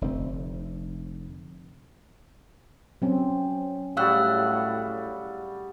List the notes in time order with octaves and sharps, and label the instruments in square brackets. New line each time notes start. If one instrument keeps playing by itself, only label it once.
[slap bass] F1 D3 A3 C4
[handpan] F#3 C4 C#4
[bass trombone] A2 [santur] G3 F#4 G#4 [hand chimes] F5 E6 F#6